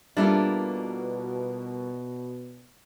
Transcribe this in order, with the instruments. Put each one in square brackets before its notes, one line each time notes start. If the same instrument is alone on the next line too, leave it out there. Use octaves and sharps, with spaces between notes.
[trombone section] B2 [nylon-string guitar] G3 A#3 F4 [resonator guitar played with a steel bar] D4 E4 A4